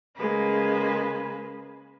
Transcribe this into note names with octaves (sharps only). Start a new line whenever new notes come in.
C#3 G#3 A#3 B4